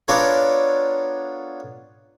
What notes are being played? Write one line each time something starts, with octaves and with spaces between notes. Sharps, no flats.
B3 D4 F4 A4 A#4 C#5